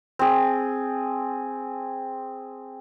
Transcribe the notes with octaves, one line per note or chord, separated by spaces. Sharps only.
C4 G#4